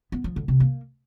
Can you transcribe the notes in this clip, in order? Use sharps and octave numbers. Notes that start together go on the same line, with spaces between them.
B3
F3
D3
C3
A#3